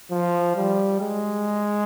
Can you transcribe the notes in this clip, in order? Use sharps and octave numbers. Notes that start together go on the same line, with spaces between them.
F3
G3
G#3